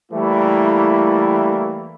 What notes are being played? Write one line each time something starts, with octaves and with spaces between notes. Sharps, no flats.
E3 G3 A3 A#3 E4